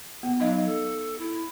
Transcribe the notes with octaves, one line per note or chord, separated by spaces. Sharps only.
B3
F#3 D#4 D#5 F5
A4
E4